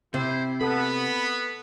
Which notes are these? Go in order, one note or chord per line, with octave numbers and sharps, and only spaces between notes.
C3 E4 C5
B3 A4 B5